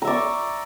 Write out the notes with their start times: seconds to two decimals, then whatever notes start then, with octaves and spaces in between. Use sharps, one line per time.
0.02 A#5
0.05 E5
0.07 D5
0.10 C#6